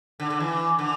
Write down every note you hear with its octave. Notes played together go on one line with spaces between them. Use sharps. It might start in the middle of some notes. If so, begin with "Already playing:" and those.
D3
D3
E3
D3